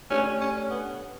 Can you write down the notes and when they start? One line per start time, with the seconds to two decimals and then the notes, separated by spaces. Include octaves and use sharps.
0.10 A3 C#4 D4 G4 C#5
0.41 C#4
0.70 B3